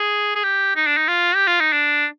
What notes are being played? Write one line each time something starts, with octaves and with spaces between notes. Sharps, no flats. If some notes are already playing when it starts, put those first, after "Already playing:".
Already playing: G#4
G#4
G4
D#4
D4
D#4
F4
G4
F4
D#4
D4